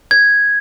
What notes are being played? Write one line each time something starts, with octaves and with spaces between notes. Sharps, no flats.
G#6